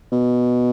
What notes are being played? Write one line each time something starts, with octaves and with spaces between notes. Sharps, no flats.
B2